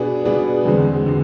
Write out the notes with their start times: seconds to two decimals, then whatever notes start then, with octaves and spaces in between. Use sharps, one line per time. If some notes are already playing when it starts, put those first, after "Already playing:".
Already playing: B2 B3 D4 G#4
0.25 B2 B3 D4 G#4
0.65 E2 D3 G#3 C4
1.06 D3 G#3